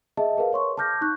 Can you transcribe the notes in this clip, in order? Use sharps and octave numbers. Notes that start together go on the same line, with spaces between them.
G#4 D#5 E5 A5
G#4 A#4 B4 F5
A#4 C#5 C6 C#6
A5 D6 F6 G6 A#6
D#4 C#6 F#6